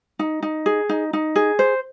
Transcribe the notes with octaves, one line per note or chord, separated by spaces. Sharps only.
D#4
D#4
G#4
D#4
D#4
G#4
C5